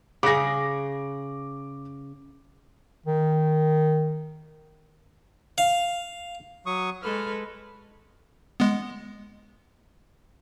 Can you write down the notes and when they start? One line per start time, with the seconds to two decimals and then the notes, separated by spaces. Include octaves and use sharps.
0.23 C#3 G#4 D6 A#6
3.06 D#3
5.58 F5
6.66 F#3 C#6 D#6
7.03 G#3 A4 B4 F6
8.60 G#3 B3